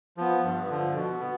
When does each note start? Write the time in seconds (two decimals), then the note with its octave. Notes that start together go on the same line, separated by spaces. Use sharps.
0.17 F3 B3
0.44 G2
0.69 D3 F3
0.95 B2
1.20 B3